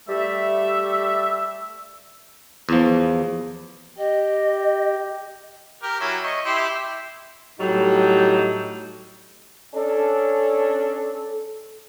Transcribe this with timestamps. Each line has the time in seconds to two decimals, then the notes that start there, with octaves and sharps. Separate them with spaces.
0.08 G3 A3 E5
2.69 E2 F3
3.98 G4 D#5
5.83 G4 A#4
6.00 F#3 C#4 E4
6.24 D#5 C#6
6.45 E4 G4 C6
7.59 A2 F#3 G3 D#4
9.74 C#4 D4 A4